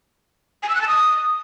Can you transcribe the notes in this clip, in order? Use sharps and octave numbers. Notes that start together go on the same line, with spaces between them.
G#5
E6
F#6
A5
D#6